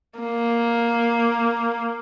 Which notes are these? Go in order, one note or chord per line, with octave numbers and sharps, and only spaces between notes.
A#3